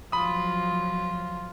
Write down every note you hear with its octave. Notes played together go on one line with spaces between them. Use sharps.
F3 F#3 F4 B5 D#6